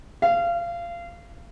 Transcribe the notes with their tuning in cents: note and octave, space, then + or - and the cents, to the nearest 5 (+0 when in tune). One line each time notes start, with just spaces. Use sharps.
F5 -25